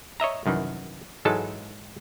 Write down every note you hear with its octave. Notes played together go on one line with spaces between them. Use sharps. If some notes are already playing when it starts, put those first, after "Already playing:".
C#5 D#5 E5 A#5
C2 F#2 D#3 E3
G#2 E3 F#3 G#3 A4 A5